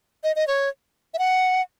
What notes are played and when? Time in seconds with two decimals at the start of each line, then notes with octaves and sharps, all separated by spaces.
0.24 D#5
0.36 D#5
0.47 C#5
1.14 E5
1.19 F#5